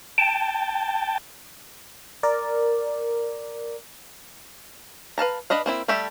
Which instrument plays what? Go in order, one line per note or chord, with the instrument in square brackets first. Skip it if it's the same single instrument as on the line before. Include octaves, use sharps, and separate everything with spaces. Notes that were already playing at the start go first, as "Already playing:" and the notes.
[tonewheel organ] G5 A5
[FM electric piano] A#4 D5
[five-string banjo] B4 F5 A5 A#5
D4 B4 D#5 F5
A#3 C4 E4
G3 A3 G4 A4 E5